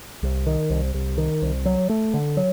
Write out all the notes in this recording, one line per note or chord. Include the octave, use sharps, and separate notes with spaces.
C2
D#3
C2
C2
D#3
C2
F#3
A3
D3
F#3